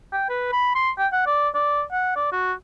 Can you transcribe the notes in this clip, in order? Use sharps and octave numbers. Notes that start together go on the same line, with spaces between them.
G5
B4
B5
C6
G5
F#5
D5
D5
F#5
D5
F#4